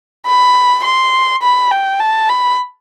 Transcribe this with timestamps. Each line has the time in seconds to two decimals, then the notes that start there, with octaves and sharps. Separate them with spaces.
0.26 B5
0.84 C6
1.42 B5
1.71 G5
2.00 A5
2.29 B5